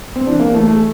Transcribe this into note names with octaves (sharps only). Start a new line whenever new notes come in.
C4
E3 D4
A#3
E3 A3
A3